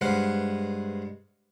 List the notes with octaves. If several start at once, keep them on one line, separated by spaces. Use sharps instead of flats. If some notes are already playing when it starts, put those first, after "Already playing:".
G2 G#3 B4 C5 F5 F#5